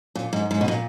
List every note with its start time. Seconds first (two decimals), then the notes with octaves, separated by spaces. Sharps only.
0.16 A#2
0.33 G#2
0.51 G#2
0.61 B2
0.68 A#2